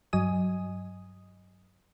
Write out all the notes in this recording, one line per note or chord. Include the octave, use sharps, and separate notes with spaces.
G2 F#3 D#5 G#5 D#6